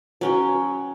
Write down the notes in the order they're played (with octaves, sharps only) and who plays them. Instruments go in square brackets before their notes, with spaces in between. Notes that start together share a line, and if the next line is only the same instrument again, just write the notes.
[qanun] F#3 C#4 G5